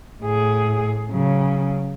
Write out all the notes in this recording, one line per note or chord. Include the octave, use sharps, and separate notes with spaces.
A2 G#4
C#3 F#3